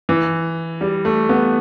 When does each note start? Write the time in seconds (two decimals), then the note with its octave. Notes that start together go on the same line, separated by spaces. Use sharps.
0.09 E3
0.81 G3
1.05 A3
1.29 B3